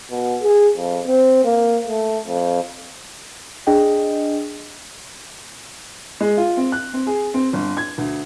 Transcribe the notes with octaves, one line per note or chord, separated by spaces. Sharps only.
B2
G#4
F2
C4
A#3
A3
F2
D4 G#4 D#5 G5
G#3
F4
C4
F#6
C4
G#4
C4
G1
G#6
D2